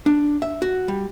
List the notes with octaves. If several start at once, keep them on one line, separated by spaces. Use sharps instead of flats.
D4
E5
F#4
G3